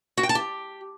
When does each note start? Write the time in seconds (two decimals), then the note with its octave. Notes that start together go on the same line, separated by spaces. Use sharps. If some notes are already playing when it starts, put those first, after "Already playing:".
0.17 F#4
0.23 G5
0.29 A5
0.35 G4